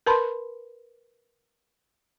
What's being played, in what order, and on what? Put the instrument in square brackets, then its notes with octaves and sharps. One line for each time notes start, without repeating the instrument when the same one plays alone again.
[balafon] A#4 B4 A5 B5 C6